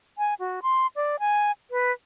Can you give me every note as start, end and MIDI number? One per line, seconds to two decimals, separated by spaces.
0.18 0.34 80
0.40 0.60 66
0.63 0.87 84
0.96 1.16 74
1.20 1.51 80
1.71 1.92 71